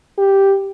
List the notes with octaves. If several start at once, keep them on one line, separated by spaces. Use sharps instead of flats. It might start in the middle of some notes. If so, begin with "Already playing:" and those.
G4